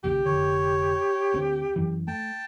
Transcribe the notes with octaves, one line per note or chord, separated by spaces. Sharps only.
A#1 D#2 C#3 G4
F1 D3 C#5
D2 D3 C4
F#2 E3
A3 G5 A5